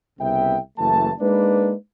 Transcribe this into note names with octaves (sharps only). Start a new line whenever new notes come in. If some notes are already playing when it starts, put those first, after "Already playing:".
C2 C#3 B3 E5 G5
F#1 E3 A3 A5
G#3 A#3 D4 D#4 B4